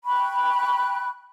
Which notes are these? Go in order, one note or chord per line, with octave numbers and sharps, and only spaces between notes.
G5 B5 C#6 F#6